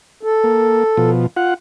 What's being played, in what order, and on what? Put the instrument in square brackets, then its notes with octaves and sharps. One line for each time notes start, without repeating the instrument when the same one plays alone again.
[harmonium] A4
[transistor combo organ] A#3
B2 F3
F4 F#5